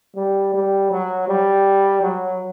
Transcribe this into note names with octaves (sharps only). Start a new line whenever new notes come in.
G3
G3
F#3
G3
F#3